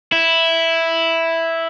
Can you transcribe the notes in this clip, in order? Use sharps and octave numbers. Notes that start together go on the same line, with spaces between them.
E4